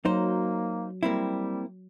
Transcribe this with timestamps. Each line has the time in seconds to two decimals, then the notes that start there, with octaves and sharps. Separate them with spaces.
0.05 F#3 A#3 D#4 C5
1.03 G3 A#3 C4 E4